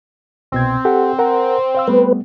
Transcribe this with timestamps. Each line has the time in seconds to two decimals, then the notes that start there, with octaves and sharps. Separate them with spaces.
0.52 C2 B2 C4 G#6
0.85 G4 A4 F#5
1.19 A#4 F#5 A#5
1.75 C5 F5 E6
1.88 G3 A3 B3 B4